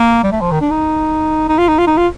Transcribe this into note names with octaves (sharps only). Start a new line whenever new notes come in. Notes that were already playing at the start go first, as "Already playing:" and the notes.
Already playing: A#3
G3
A3
F3
D#3
D4
D#4
D#4
F4
D#4
F4
D#4
F4